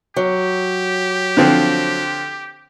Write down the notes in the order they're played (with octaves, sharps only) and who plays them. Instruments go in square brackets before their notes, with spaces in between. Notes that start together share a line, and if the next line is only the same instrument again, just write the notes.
[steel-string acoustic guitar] F#3 [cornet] G4
[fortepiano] D3 F3 C4